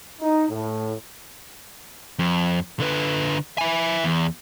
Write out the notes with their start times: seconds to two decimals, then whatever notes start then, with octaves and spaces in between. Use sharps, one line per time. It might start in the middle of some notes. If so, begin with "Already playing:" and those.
0.21 D#4
0.50 A2
2.19 F2
2.80 D3 B4
3.58 E4 G#5
4.04 E2